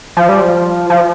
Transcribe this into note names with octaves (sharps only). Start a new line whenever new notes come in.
F3
G3
F3
F3